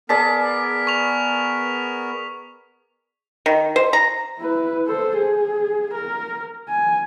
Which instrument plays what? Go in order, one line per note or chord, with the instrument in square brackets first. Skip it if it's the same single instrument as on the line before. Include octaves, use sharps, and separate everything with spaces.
[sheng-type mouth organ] B3 A#4 [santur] G#4 D5 A5 [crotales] B6
[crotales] C#6 F7
[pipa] D#3
C5
A#5
[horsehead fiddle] E4 B4
A4 C5
G#4
A#4
G#5